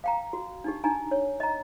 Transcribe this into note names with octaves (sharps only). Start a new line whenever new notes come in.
F5 G5 A#5
F#4
D4 D#4 G4
D4 D#4 G#5 A#5
C#5
D#5 A#5